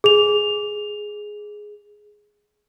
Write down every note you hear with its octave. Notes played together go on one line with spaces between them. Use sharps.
G#4 F7